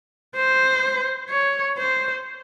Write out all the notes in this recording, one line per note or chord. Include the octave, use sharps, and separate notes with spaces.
C5
C#5
C5